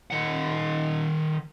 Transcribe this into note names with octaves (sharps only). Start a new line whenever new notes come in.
D#3 F#5